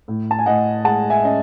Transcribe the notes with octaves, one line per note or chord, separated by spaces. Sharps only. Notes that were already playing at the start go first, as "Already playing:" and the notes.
A2
A5
G#5
A2 D#5 F#5
G#3 F#5 A5
E5 G#5
C#4 D#5